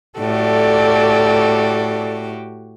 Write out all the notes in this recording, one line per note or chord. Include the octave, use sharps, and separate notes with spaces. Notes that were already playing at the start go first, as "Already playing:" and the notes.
A2 F#4 G4 A4 D5